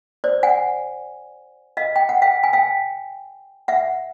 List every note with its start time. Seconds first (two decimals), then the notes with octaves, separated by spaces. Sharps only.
0.24 C5 D5
0.43 F#5 G#5
1.77 D#5 F5
1.96 G5
2.09 F#5
2.22 F5 G5
2.44 G#5
2.53 F5 G5
3.68 E5 F#5